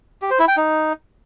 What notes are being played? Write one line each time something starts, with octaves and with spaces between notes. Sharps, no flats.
G4
C5
E4
G5
D#4